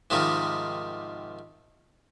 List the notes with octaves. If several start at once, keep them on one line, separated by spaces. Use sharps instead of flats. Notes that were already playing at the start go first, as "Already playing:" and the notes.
G#2 C3 D#3 F3 G3